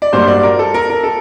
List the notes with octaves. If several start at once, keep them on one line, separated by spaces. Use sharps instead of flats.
D5
G2 F#3 A#3 C5
D5
A#4
A4
A#4
A#4
A4